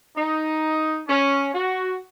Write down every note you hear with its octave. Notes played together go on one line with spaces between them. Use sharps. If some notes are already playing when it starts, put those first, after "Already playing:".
D#4
C#4
F#4